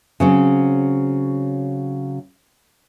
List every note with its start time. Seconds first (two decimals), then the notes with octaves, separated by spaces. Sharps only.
0.20 C#3 F#3 C4